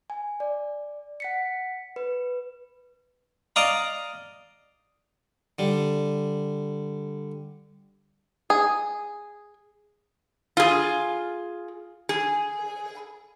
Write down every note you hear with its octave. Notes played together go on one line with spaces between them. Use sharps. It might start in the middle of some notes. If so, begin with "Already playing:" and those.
G#5
D5
F#5 B6 C#7
B4
D5 D#5 F5 A#5
D3 G3
G#4
F4 G#4
G#4